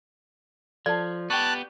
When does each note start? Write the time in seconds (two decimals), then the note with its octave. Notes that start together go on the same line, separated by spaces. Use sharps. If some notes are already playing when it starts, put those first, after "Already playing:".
0.86 F3 A4 D5 A5
1.30 B3 G4 G5 A5 C#6 F#6